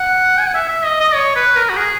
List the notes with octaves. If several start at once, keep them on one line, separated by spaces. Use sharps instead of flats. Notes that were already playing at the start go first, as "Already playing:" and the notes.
Already playing: F#5
G#5
F#5
E5
E5
D#5
D#5
C#5
B4
A#4
F#4
G#4